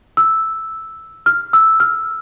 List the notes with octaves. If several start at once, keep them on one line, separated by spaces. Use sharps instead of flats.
E6
F6
E6
F6